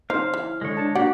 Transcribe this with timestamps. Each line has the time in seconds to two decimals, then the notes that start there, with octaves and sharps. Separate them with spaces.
0.10 C#4 D#4 F4 C5 F5
0.34 E3
0.61 D3 G#3 C#5
0.77 D4 A5
0.95 A#3 D4 F#4 G4 D5 F#5